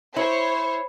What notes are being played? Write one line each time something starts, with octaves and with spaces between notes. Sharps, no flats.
E4 C5 C#5